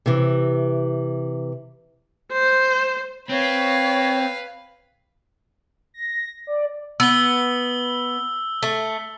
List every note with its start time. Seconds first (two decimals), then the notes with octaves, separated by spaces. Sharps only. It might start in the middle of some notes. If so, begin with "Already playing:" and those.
0.06 C3 E3
2.32 C5
3.29 C4 B4 C#5 F5
5.94 A#6
6.47 D5
7.00 B3 E6 G7
8.63 A3